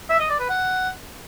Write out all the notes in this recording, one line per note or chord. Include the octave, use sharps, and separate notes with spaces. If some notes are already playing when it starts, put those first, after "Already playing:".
E5
D#5
D5
B4
F#5